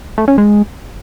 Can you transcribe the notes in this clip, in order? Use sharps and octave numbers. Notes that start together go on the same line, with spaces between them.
A3
C#4
G#3